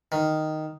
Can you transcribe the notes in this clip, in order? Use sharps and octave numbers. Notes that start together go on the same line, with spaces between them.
D#3